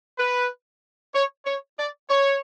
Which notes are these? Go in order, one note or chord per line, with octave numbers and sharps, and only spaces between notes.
B4
C#5
C#5
D5
C#5